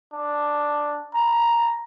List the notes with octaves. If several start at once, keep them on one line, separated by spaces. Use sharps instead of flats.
D4
A#5